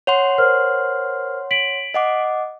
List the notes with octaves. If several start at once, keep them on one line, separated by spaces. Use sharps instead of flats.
C#5 F#5 C6 F7
A#4 C5 F6
B6 D7 F#7
D#5 F#5 D6